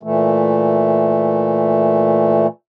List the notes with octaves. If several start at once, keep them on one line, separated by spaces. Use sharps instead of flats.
A#2 E3 A3